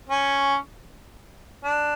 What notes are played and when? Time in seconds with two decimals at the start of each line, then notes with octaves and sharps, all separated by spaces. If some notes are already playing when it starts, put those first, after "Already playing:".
0.10 C#4
1.64 D4